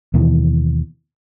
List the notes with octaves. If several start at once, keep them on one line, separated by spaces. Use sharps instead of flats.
D#2 B2 E3